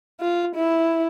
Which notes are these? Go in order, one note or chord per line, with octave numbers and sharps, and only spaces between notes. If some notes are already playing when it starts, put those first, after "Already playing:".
F4
E4